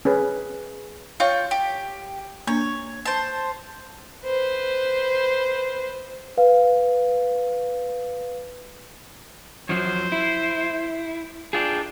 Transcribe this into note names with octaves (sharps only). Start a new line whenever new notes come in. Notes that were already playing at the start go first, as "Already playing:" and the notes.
C#4 G#4 B4
F4 C#5 F5 G5 C#6
G4
A#3 D4 C#5
C5 A5
B4 C5
B4 F5
F#2 F3 F#3 C5
E4
D4 F4 G#4 G5